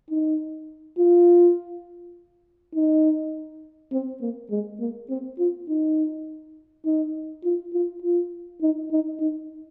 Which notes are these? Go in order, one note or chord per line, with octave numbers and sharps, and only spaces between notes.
D#4
F4
D#4
C4
A#3
G#3
A#3
C4
F4
D#4
D#4
F4
F4
F4
D#4
D#4
D#4